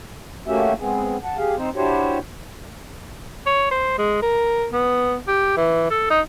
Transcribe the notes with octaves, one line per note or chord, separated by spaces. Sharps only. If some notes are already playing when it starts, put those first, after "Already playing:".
A3 A#3 C#4 F#4 G4 E5
G#3 B3 C4 G#4
F#5 A5
G4 G#4 F5
C4 D#4 C5
D4 E4 F#4 G4 C5 C#5
C#5
C5
G#3
A#4
B3
G4
E3
A4
D#4